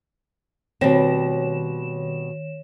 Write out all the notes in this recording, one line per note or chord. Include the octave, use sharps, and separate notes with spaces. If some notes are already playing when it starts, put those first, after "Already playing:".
B2 D#3 G3 C4 C#5 E7